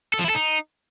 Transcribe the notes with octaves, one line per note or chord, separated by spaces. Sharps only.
A4
F3
E4
A4
D#4